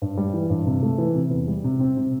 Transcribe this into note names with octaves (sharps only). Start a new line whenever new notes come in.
G2
G3
E3
G2
C3
A3
E3
C3
E2
G3
C3
C4
C3